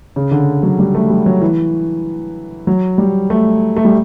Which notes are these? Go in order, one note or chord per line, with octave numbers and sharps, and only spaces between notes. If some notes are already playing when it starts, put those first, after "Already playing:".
C#3
D3
F#3
G3
A3
G3
F#3
E3
F#3
G3
A3
A3
G3